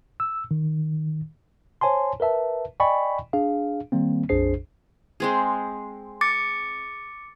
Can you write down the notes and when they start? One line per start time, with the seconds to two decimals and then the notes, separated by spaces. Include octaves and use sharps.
0.20 E6
0.51 D#3
1.81 C5 C#5 G#5 A5 C6
2.20 A#4 B4 E5 A5
2.80 D5 D#5 G5 G#5 B5 C#6
3.33 D4 G#4 F5
3.92 D#3 G3 A#3 C4
4.29 A#1 F2 D4 G#4 C5 C7
5.20 G#3 C4 G#4
6.21 D6 A6 C#7